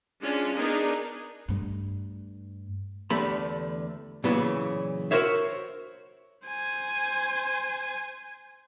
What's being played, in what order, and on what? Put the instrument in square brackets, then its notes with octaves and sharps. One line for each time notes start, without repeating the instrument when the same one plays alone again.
[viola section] G#3 C#4 D4 F4
B3 D4 D#4 G#4 A#4
[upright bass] G2 A3
[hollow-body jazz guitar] E2 D3 A3 G4 B5
A#2 C#3 E3 F#3 B3
F#4 A#4 C5 C#5 E5
[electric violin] C5 G#5